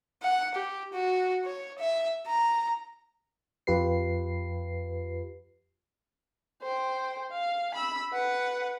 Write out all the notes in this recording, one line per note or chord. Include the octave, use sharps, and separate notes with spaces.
F#5
G4
F#4
C#5
E5
A#5
F2 F4 G4 B4 C7
C5 G5
F5
B5 E6
B4 F#5